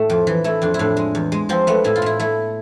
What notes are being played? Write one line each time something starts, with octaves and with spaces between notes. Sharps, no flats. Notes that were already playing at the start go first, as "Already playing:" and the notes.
Already playing: A2 A3
F2
E3
A3 E4
F2 D4
E4
A2 D4
G#3
E2
G#3
F3 C4
A3 B3
A2 E4
F4
A2 E4
A3 E4